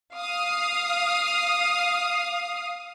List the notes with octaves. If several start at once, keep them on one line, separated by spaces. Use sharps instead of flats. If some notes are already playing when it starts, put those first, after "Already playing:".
F5 D#6